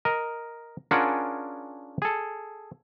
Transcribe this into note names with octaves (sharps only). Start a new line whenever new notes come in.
A#4 D#5
C#4 D4 F4 G#4 A#4 F#5
G#4 A4